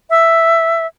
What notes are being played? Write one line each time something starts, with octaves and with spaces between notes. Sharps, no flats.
E5